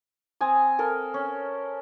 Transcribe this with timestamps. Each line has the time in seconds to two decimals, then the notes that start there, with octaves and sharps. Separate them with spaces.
0.41 C4 G#5 D#6
0.79 A4 A#4 F5
1.14 C#4